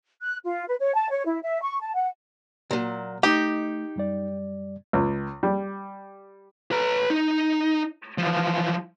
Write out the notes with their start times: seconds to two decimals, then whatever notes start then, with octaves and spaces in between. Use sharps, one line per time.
0.22 F#6
0.44 F4
0.68 B4
0.79 C#5
0.95 A5
1.10 C#5
1.25 E4
1.43 E5
1.62 C#6
1.81 A5
1.94 F#5
2.71 A#2 F#3
3.23 A3 D#4 G4 D#5
3.96 F#2 G3 D5
4.93 C#2
5.43 G3
6.71 B4 A#5
7.10 D#4
8.18 E3 F3